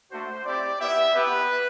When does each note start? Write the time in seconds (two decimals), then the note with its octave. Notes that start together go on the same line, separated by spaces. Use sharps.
0.11 A3 D4 F#4 C5
0.45 C4 E4 G4 D5
0.80 B3 E4 G4 E5
1.14 B3 E4 G4 B4